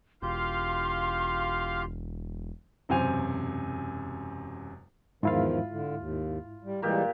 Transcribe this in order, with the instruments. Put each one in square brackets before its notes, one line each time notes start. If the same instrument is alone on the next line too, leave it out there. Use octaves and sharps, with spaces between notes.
[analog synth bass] E1 [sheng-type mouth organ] F4 G4 G6 [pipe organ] F5 [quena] C6
[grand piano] E1 F#2 C3 C5 G#5 F7
[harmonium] E2 D#3 F3 [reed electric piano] G#2 E4 F5 [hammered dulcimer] F4 B5
[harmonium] D3
D#2
G3
[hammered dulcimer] A#2 G4 A#4 [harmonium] E3 G3 G#3